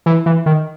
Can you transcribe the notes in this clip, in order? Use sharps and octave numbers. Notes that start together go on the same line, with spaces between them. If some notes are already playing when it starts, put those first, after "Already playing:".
E3
E3
D#3